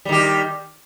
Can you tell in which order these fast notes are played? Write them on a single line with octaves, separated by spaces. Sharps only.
G3 D#3 G4